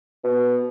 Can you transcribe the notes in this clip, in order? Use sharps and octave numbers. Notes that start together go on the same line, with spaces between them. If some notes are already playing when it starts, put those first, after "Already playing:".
B2